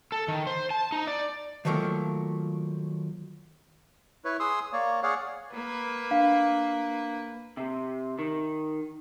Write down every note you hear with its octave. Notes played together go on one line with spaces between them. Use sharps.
A4
D#3
C5
A5
D#4
D5
D#3 F3 F#3 A3 A#3
E4 B4 C#5
G#4 C6 D#6 E6
A#3 C#5 D5
G#4 C#5 D5 F5 F#5
A#3 B4
D4 F5
C3
D#3